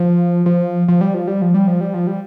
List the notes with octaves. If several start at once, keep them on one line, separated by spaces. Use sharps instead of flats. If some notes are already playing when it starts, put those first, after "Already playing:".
Already playing: F3
F3
F3
G3
F3
G3
F3
G3
F3
G3
F3
G3